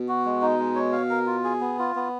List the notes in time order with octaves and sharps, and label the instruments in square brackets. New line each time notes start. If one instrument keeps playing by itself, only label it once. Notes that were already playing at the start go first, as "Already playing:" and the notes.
Already playing: [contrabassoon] B2
[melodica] F#4
G#3
D#4
G#3
C#5
F5
A#4
F4
G#4
B3
F4
B3